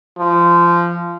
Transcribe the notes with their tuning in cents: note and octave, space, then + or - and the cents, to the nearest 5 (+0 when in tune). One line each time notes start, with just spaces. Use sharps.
F3 -20